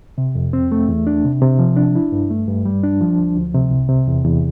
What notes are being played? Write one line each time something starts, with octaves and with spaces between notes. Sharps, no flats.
C3
F2
C4
A3
E2
D4
C3
C3
F3
D4
E4
G2
A3
G2
G3
D4
F3
D2
D2
C3
C2
C3
E2
E2